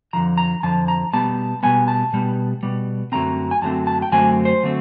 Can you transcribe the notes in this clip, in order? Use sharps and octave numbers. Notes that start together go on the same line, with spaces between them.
F2 D3 F3 A#5
A#5
F2 D3 F3 A5
A#5
B2 G3 B3 A5
B2 G3 B3 G#5
A5
B2 G3 B3
B2 G3 B3
F#2 D3 F#3 A3 C4 A#5
G#5
F#2 D3 F#3 A3 C4 A5
A5
G5
F#2 D3 F#3 A3 C4 G#5
C5
D3 F#3 A3 C4